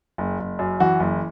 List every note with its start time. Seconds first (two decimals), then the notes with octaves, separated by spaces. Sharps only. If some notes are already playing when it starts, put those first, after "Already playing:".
0.18 F#1
0.39 F#1
0.59 F#2
0.80 E3 F#4
1.00 F#1